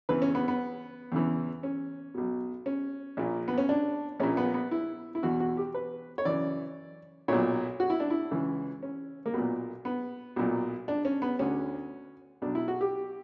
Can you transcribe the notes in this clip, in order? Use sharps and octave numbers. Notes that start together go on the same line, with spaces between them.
E2 C#3 E3 B4
C#4
B3
B3
E2 C#3 E3
C#4
B1 B2
C#4
A#1 A#2
B3
C#4
D4
A#1 A#2 C#4
B3
B3
E4
E4
E2 B2 F#4
F#4
G4
B4
C#5
F#2 C#3 E3 D5
B1 A#2 C#5
F#4
E4
D4
E4
C#2 C#3 E3
C#4
A#3
B1 A#2 B3
B3
B1 A#2
D4
C#4
B3
D2 D3 C#4
B1 B2 D4
E4
F#4
G4